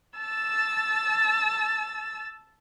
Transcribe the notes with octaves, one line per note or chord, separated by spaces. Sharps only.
A5 E6 A6